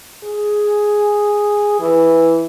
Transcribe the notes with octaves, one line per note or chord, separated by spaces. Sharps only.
G#4
E3